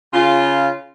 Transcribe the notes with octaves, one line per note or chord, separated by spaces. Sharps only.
C#3 F4